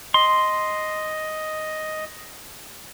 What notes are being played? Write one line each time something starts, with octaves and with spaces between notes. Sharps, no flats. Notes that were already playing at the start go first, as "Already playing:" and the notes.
D#5 C6